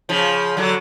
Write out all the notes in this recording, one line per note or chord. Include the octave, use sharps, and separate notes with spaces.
C#3 F3
D3 F#3